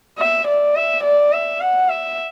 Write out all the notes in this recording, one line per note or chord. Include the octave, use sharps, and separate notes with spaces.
E5
D5
E5
D5
E5
F#5
E5